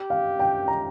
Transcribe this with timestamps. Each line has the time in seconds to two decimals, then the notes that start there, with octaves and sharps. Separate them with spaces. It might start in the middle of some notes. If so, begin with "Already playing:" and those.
Already playing: G4
0.10 F5
0.39 G5
0.68 A#5